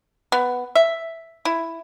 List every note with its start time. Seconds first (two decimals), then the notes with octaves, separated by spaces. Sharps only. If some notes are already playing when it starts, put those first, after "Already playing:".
0.32 B3
0.75 E5
1.45 E4